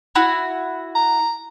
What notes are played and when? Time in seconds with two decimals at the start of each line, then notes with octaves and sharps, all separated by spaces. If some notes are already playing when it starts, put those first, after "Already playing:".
0.15 E4 F#4
0.95 A#5